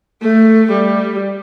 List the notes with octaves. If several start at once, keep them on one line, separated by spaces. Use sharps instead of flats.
A3
G3